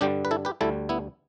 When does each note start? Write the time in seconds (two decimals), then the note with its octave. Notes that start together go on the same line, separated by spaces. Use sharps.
0.01 G2 D3 G3 D4 G4
0.25 B4
0.31 E4 A4
0.45 G4 B4
0.61 D2 D3 G3 E4 A4
0.89 B3 E4